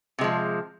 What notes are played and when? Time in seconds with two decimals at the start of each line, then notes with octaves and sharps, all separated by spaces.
0.19 C3
0.21 G#3
0.24 F3